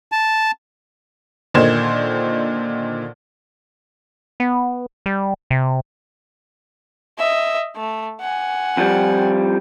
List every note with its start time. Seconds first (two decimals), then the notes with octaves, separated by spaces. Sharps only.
0.12 A5
1.54 A#2 D3 D#3 C5 G#6 E7
4.40 B3
5.06 G3
5.50 C3
7.18 D#5 E5
7.76 A3
8.20 F#5 G#5
8.77 F2 F3 G3